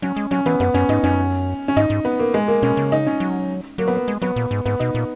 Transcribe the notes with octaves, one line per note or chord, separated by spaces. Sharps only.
F#3 C#4
G#3
F#3 C#4
E3 B3
F#2 B3
F#2 C#4
G#2 D#4
F#2 C#4
C#4
G#2 D#4
G#2
B3
A#3
G#3
A#3
B2 C#4
C#3
D#4
C#4
F#3
F#3 A#3
B3
A#3
G#3
F#3 B3
A#2
G#2
G#2 B3
B2 D#4
A#2